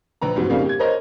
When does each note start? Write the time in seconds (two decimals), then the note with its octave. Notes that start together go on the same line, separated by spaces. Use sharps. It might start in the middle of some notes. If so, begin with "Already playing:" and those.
0.22 A#1 B4 A#5
0.36 F2 G#2 C3 F#3
0.50 F2 C#3 G3 A#3 D#4 F5
0.65 G4 G#6
0.79 A#4 C5 C#5 D#5 A#5